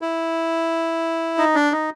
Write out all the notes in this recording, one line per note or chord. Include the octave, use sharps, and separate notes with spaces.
E4
D#4
D4
D#4